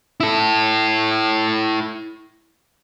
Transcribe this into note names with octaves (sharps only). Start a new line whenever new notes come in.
E4 A4